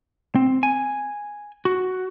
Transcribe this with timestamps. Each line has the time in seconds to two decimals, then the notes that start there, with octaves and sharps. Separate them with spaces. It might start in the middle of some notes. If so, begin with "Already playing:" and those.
0.35 C4
0.63 G#5
1.65 F#4